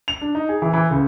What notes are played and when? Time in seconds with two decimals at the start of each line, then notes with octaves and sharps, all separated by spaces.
0.08 F7
0.21 D4
0.35 D#4
0.49 G#4
0.62 E3
0.73 E3
0.91 C#2